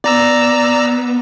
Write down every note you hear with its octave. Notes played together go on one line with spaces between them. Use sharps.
B3 D5 A#5 E6